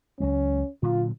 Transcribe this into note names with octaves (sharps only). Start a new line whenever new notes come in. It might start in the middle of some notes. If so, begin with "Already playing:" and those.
C#2 F#3 G#3 C#4
A#2 D3 F#3 F4